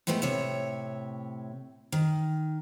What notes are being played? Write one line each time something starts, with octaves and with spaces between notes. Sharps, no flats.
A2 G#3 A3 B3 B4 G5
A2 C3 C#5 E5
D#3